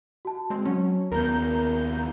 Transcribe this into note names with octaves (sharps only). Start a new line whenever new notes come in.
F#4 A5
G#3 C4
F#3 C#4
D#2 B3 A#4 A#5 G6